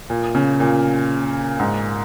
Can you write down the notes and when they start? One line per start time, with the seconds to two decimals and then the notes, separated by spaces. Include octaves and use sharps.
0.10 A#2
0.35 C#3
0.60 A#2
1.59 G#2